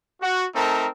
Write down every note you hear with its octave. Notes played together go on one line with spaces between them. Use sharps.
F#4
A3 C4 D#4 A#4 A5